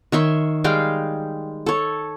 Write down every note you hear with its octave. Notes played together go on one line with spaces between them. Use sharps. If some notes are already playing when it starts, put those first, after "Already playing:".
D#3 C#5 E5 C6
G3 G#3 F5 G5
A4 C#5